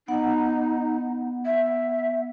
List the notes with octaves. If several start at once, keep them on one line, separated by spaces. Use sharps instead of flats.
B3 D#4 F#5
E5